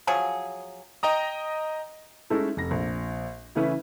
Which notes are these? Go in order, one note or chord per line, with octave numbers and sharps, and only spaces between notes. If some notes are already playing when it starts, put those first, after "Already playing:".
F3 F#3 G#4
D#5 G5 A#5 D#6
G#3 A3 C#4 D#4 E4 A4
F1 A#6
A#1
C#3 E3 A3 C#4 E4 B4